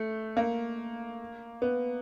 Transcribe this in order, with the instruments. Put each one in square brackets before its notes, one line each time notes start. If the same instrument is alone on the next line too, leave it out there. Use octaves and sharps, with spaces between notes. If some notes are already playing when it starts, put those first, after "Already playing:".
Already playing: [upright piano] A3
A#3
B3